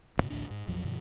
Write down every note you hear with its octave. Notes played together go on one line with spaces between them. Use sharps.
A1 D2 G2 C3
A1 D2 A2 D4
G#2
A#1 F2 F3 F#3
G2 B2 D#3 F3